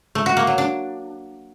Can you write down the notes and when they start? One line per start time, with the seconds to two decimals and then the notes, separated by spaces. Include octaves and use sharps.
0.15 A3
0.26 F#4
0.37 A#3
0.47 F#3
0.58 D4